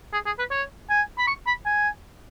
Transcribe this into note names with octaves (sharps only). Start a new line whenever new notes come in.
G#4
G#4
B4
C#5
G#5
B5
C#6
B5
G#5